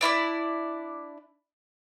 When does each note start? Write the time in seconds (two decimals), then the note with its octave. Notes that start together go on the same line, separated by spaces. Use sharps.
0.01 D4 E4 A#4 D5